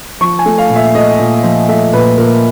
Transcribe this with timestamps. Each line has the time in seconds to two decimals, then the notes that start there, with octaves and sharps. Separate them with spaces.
0.21 F3 C#6
0.39 G#5
0.46 A3
0.58 F5
0.70 A#2
0.76 E5
0.95 A3 D#5
1.19 A#2
1.43 F3
1.69 A3 E5
1.93 A#2 B4
2.18 A#2 A#4